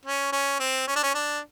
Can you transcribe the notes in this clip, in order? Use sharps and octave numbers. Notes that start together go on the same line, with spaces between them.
C#4
C#4
C4
C#4
D4
C#4
D4